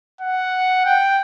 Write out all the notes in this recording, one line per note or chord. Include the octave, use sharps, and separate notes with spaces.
F#5
G5